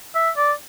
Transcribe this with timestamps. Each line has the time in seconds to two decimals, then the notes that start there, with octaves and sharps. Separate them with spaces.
0.15 E5
0.37 D5